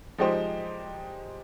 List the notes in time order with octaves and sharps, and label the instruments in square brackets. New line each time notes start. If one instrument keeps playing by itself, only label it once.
[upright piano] F3 G#3 D#4 G4 C5